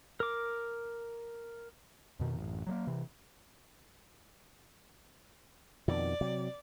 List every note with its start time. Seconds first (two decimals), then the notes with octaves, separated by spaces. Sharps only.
0.20 A#4 D6
2.19 F2 B2 D#3
2.37 A1 F#2
2.67 F#3 G3 A#3
2.87 C3 E3
5.88 F2 B2 D#3 D5
6.21 C3 F#3